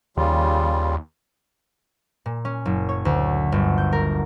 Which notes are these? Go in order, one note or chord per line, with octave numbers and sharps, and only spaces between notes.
D#2 C#3 G3 F4
A#2
C#4
F#1
C#5
D2
G1
G6
A#4